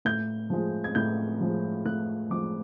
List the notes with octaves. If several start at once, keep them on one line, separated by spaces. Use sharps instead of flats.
A2 G6
F3 G#3
G#6
A2 G6
F3 G#3
A2 F#6
F3 G#3 D6